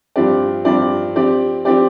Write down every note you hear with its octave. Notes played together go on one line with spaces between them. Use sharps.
G2 F3 C4 G4 D5
G2 F3 C4 G4 D5
F3 C4 G4 D5
F3 C4 G4 D5